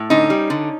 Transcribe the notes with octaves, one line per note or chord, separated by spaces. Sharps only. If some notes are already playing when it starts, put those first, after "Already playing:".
Already playing: A2
D3 C#4 D#4
G3
D3